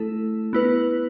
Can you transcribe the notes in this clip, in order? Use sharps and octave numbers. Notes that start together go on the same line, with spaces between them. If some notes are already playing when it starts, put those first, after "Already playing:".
Already playing: A3 E4 A4
B3 E4 B4